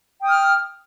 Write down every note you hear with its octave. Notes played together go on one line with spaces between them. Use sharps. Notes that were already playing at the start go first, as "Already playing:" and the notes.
G5 D#6 F6